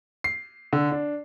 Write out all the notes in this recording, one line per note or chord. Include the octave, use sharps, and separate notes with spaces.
C7
D3
D4